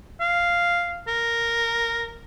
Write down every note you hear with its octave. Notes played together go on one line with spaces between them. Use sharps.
F5
A#4